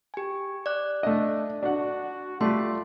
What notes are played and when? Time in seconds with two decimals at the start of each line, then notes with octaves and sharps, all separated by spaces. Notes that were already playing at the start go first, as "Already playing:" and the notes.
0.14 G4 G#5
0.66 D5 F#6
1.03 A3 D4 D#5
1.63 D4 F#4 F#5
2.41 G3 A3 F4 D5 C6